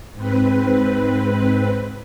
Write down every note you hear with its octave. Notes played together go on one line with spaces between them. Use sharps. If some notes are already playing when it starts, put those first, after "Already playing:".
G#2 C4 B4